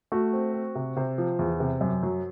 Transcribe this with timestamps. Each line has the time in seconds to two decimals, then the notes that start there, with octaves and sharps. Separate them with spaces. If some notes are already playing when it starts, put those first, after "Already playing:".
0.12 A3 F#4
0.33 C4
0.54 C4
0.75 C3
0.96 C3 C5
1.18 F3
1.39 E2
1.60 C3
1.81 F#2
2.03 F#3